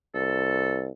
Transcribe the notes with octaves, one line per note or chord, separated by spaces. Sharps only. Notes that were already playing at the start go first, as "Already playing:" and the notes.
C2 A4